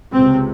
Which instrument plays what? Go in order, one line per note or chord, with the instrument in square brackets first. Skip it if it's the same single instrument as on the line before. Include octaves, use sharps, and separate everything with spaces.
[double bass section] C#2 C3 C4